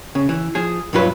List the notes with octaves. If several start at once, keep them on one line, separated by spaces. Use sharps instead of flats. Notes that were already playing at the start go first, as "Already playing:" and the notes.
C#3
E3
F3 G#4
B1 G2 F#3 F4 B4